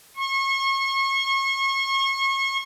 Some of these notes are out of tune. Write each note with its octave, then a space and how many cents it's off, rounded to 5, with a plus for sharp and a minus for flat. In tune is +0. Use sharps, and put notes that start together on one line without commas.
C#6 -35